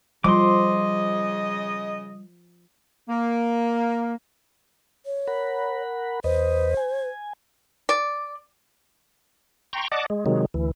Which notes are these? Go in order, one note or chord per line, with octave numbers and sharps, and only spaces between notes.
C#3 F3 G3 D#5 C6 D6
A#3
C#5
A#4 F#5 B5
E2 B4 C5 D#5
G#5
D5
G5 A#5 C6 C#6
D5 D#5 F#5 A5 D6
G#3
C3 D#3 F#3 G#3
D2 E3